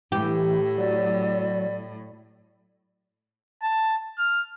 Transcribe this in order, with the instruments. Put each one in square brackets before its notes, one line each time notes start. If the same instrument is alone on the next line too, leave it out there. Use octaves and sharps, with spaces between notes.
[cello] A2 [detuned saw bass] E3 [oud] G4
[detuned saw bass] F#3 [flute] D5
[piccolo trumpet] A5
F6